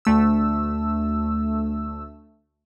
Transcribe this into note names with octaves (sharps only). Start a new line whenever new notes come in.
D2 A3 E6